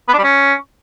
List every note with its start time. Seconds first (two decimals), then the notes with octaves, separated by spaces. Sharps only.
0.08 B3
0.13 D4
0.18 G3
0.23 C#4